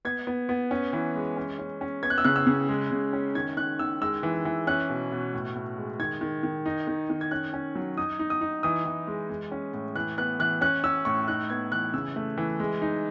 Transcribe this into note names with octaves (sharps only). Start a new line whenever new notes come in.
B3 G#6
B3
B3
C#4
E3
G#3
C#4
C#4
C#4
B3 G#6
F#6
E6
C#3 F#6
E6
C#3
G#3
C#3
C#4
D#3 G#6
D#3 F#6
D#3 E6
G#3 E6
E3
E3
C#4 F#6
B2
B2
A2
A2
G#3
D#3 G#6
D#3
D#3
D#4
D#3
D#3
G#6
C#4 F#6
C#4
F#3
D#4 D#6
D#4
D#6
D#4
E3 D#6
E3
G#3
G#3
C#4
A2
E3 F#6
B3 F#6
E3 F#6
C#4 F#6
C#4 E6
A2 C#6
D#4 F#6
B3 G#6
E3 F#6
C#3 E6
A3
E3
G#3
D#4